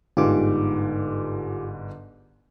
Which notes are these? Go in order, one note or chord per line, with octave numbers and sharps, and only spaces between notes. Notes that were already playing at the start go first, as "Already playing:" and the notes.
G1 G#2 F4 G4 D6